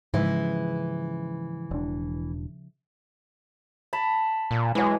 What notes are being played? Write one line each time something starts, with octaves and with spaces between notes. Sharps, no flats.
G#2 C#3 E3 F3 G#3 E5
E1 D4
A5 B5
A#2
E3 F#3 G#3